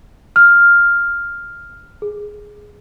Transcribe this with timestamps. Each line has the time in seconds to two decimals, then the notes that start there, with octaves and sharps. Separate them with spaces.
0.36 F6
2.02 G#4